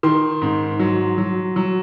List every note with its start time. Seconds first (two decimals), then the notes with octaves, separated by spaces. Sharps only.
0.03 D#3 C6
0.42 G#2
0.80 F#3
1.18 F#3
1.56 F#3